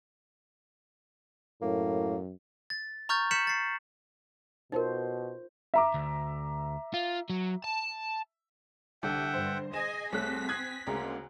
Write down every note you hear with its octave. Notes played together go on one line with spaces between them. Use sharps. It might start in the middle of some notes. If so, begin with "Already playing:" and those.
F#2 A2 A#3
A6
A#5 C#6 F6 G6 A6
F6 G6 B6 C#7 E7 F#7
A6 C7
B2 D#4 F4 A#4 C5 C#5
E5 A#5 D6
D2
F4
F#3
A5
C2 D3 E5 F#5 G5
G2 C5
G#4 D#5 G#5 E7
C2 A3 C4 A4 C#5 F#6 B6
G#5 D#6 F#6 G#6 C7
D2 C#3 G#3 A#3 A#5